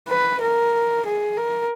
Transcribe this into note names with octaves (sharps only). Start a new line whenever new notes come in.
B4
A#4
G#4
A#4